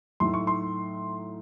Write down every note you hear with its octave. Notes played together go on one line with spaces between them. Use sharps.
A2 F#3 A3 D#4 C6
C#6
C6